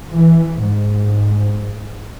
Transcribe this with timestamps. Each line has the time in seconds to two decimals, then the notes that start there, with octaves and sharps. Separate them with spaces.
0.12 E3
0.61 G#2